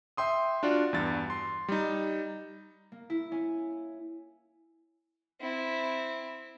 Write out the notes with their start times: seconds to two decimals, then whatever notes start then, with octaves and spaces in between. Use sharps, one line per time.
0.17 E5 G5 C6 D#6
0.63 D4 F4 F#4 D5
0.93 E2 G2 A6
1.30 C6
1.68 G3 D#4
2.92 A#3
3.10 E4
3.32 C#4
5.41 C4 E4